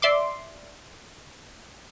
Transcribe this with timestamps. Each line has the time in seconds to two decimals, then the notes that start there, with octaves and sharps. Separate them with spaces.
0.02 D5 E5 C6 D6